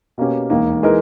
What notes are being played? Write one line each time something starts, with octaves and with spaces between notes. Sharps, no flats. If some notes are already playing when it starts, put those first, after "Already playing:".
B2 A#3 C#4 G4
E1 D#2 D#3 A#3
E3 G#3 D#4 A#4